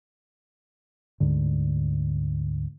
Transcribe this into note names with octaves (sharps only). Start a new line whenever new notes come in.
D2 G#2 D3